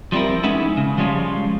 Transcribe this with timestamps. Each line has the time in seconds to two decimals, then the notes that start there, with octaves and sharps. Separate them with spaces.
0.12 F3 G3 C4 E4 A#4
0.43 G#3 B3 C#4 D#4 E4 G#4
0.77 C#3
0.98 F3 G3 G#3 C#4 F4